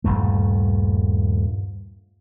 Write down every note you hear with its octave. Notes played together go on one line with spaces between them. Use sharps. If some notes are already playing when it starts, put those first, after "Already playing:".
D#1 G#1 G2 A3